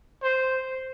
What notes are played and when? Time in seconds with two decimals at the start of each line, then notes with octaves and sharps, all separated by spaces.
0.23 C5